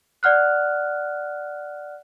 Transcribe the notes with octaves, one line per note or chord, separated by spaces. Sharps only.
D5 F#5 F6 F#6